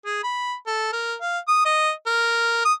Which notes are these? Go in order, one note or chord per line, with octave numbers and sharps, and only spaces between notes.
G#4
B5
A4
A#4
F5
D#6
D#5
A#4
D#6